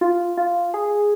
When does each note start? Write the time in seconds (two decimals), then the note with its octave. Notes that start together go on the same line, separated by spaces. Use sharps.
0.01 F4
0.37 F4
0.74 G#4